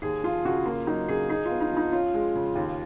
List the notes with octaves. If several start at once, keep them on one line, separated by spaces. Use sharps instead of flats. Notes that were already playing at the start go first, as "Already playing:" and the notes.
D#2 G#4
F3 F4
C#3 F#4
A#3 F4
F#3 D#4
C#3 G#4
D#4 G#4
F4
B3
D#4
F3 D#4
C#4 F4
G#3
C#3
D#2